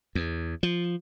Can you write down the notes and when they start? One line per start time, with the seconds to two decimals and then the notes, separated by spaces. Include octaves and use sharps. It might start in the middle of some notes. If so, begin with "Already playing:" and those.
0.15 E2
0.63 F3